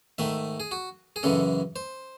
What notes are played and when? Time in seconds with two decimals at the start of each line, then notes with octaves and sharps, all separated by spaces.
0.18 G#2 D#3 A3 E5
0.60 G#4
0.71 F#4
1.16 G#4
1.23 F#2 C#3 E3 G#3 A4
1.76 C5